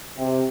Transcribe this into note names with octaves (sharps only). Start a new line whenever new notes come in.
C3